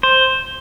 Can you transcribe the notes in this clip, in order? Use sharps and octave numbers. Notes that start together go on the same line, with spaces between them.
C5